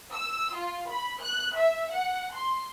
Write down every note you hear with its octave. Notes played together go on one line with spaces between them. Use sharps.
E6
F4
B5
F#6
E5
F#5
C6